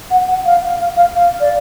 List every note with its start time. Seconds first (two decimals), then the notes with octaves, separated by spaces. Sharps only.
0.11 F#5
0.28 F#5
0.45 F5
0.80 F5
0.97 F5
1.15 F5
1.40 D5